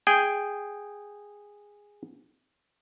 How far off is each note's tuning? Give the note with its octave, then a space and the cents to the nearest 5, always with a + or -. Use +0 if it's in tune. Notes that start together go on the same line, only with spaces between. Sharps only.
G#4 -10 G5 +0